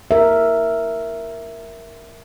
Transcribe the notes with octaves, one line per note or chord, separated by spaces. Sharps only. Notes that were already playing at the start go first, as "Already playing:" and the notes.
A#4 E5